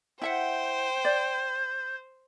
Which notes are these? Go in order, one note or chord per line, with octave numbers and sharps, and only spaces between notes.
E4 C5 E5 F#5 G5
D5 G6